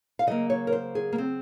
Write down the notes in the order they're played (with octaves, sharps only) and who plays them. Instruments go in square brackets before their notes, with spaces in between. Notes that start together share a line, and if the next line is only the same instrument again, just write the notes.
[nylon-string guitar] F5
C#3 F#3 A#3 D#5
C#5
A#4
C5
G#4
A#3
C4